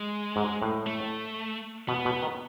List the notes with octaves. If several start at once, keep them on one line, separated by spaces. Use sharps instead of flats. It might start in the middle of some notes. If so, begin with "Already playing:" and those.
Already playing: G#3
G#2
A2
A3
B2 B3
B2
D#3